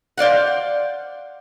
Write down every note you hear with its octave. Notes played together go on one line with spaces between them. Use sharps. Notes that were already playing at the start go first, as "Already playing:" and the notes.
C5 D5 F5 F#5